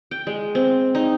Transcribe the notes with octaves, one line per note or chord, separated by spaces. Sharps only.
G5
G#3
C4
D#4